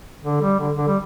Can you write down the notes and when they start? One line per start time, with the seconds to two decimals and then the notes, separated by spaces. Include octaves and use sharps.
0.23 D3
0.41 G3
0.59 D3
0.78 D3
0.87 G3